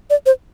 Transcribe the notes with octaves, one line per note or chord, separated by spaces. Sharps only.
D5
C5